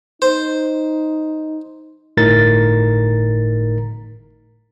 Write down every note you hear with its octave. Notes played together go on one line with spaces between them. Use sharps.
D#4 C5
G1 A2 D#4 A#4 A#5 A6